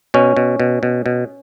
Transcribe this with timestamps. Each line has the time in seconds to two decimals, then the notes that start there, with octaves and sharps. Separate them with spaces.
0.14 B2 C#4
0.37 B2
0.60 B2
0.83 B2
1.06 B2